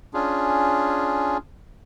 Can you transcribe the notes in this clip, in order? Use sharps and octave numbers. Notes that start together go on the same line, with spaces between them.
C#4 D4 F4 G#4